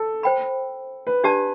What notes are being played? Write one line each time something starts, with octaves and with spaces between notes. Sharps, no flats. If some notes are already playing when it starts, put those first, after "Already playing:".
Already playing: A4
C5 G5 B5
B4
D4 G4 D5 A5